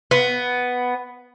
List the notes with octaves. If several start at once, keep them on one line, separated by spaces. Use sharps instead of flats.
B3